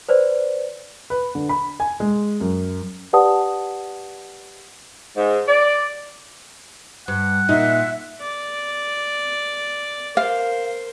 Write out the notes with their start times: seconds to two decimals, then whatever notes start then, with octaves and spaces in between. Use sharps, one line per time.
0.09 B4 C5 D5
1.10 B4
1.35 D3
1.49 B5
1.80 G#5
2.00 G#3
2.41 F#2
3.13 G4 B4 D5 F#5 A5 D#6
5.17 G#2
5.48 D5
7.08 G2 F#5
7.49 A#2 D#4 E5
8.20 D5
10.17 A#4 C5 F5